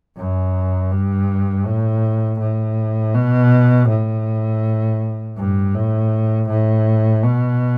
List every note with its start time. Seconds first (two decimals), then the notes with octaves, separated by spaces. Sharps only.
0.17 F#2
0.91 G2
1.66 A2
2.40 A2
3.15 B2
3.89 A2
5.38 G2
5.75 A2
6.50 A2
7.24 B2